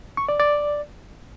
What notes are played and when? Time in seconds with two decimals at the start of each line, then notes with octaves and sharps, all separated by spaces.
0.17 C#6
0.29 D5
0.40 D5